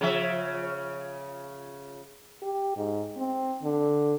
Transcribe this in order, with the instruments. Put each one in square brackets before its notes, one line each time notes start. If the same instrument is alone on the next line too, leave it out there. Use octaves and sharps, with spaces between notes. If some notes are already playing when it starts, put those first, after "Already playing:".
[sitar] C#3 F3 E5
[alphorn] G4
G#2
C4
D3